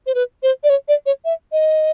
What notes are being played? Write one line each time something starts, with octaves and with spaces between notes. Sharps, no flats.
C5
B4
C5
D5
C#5
D5
C#5
E5
D#5